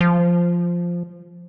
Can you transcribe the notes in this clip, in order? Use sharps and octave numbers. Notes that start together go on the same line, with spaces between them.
F3